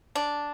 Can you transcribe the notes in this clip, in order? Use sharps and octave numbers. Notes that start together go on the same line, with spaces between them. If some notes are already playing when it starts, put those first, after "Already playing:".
D4